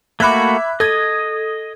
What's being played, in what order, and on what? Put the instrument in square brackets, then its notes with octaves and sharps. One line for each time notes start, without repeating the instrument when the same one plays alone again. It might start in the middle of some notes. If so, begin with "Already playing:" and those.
[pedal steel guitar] A3 A#3 F#4 [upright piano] E5 B5 [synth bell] D6 F#6 G#6
[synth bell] A4 [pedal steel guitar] D#5 [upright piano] D#6 G#6